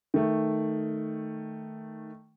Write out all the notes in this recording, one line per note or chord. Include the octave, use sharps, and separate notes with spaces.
D#3 A3